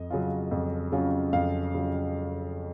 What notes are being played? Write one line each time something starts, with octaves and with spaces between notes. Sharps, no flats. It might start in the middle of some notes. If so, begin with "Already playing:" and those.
Already playing: F2 D#5
C#3 F#3 C#4 F4
F2
C#3 F#3 C#4 F4
F2 F5
C#3 F#3 C#4 F4